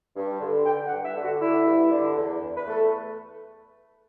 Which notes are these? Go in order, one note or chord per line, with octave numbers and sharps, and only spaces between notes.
G2
D3
D3 G5
F#5
G2
E5
D3
F#4
D3 E4
G2
D3
E2
E2
B4
A3 A4